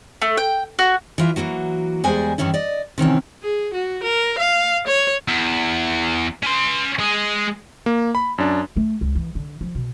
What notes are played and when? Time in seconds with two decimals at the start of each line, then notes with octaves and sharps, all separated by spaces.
0.22 A3
0.37 G5
0.79 F#4
1.18 E3 F4 E5
1.36 E3 F#3 A#3 F#4
2.04 E2 G3 G#3 G#4 C5 G#5
2.38 G2 D#3 E3 C#4 E4
2.54 D5 D#5
2.98 C3 D#3 E3 C#4
3.43 G#4
3.73 F#4
4.03 A#4
4.38 F5
4.87 C#5
5.28 E2
6.43 C#4 C6
6.99 G#3 G#4
7.86 A#3
8.15 B5
8.38 F#2 D4
8.77 A3
9.01 C#2
9.15 E3
9.35 D3
9.61 F3
9.75 B2